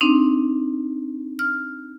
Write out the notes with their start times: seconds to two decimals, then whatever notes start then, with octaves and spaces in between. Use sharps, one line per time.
0.01 C4 D4 D#4
1.39 F6